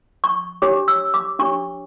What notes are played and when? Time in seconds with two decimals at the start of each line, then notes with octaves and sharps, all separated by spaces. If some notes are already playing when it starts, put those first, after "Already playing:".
0.24 C#6
0.62 D4 G4 C#5 D6
0.88 E6
1.14 D6
1.39 D4 G4 C#5 C#6